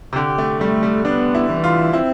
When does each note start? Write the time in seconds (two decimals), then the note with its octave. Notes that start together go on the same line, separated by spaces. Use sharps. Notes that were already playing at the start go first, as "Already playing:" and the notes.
0.13 C3
0.16 D3 G4
0.38 A3
0.60 G3 A3
0.83 G3
1.05 B3 D4
1.35 E4
1.50 E3
1.64 F4
1.93 C4 E4